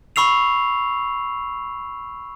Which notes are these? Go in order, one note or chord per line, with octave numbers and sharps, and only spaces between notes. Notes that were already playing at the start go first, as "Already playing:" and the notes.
B5 C#6 E6 C7 F7